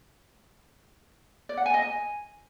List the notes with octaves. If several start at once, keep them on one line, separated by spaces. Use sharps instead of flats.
D5
F#5
G#5
D#5
G#5